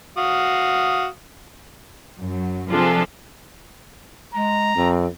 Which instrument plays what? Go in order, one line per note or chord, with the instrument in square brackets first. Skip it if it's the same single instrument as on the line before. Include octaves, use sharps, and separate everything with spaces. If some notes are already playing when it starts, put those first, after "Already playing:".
[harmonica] F#4 F5 D#6
[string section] F#2 F#3
C3 F3 D4 F4 G#4 A4
[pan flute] G#3 [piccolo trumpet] A#5
[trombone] F2 [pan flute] C4